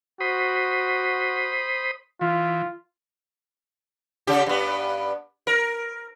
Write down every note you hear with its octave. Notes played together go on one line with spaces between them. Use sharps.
F#4 C5 B5 D#6
E3 F4
C#3 G4
G2 B3
A#4